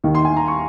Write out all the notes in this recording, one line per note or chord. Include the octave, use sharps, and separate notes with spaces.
D#2 D#3
C6
G#5
A#5
C#6